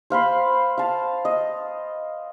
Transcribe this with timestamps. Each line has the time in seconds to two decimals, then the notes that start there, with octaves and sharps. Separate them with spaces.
0.10 C5 F5 B5 C6
0.78 F5 A5
1.25 D#5